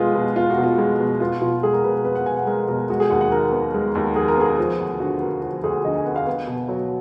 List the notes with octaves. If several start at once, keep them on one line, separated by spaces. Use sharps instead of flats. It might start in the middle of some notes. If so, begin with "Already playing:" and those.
Already playing: B2 G#3 B3 F4 G#4 B4
B2
B3 F4
F#4
B2
F4
G#3
B2
B3 F4
B2 F4
G#3 G#4
A#4
B2 B4
A#4
B3 B4
F#5
B2 G#5
F#5
G#3 A#4
B2 A#4
G#3 F#4
G#4
D#2 F#5
F#5
D#3 A#4
B3
G#3
D#2
D#3 G#4
A#4
B3 G#4
F3
D2
D3 F#4
B3 A#4
F3 F#4
D2 G#4
D3 D#5
G#5
B3 F#5
F5
B3
B2
F#3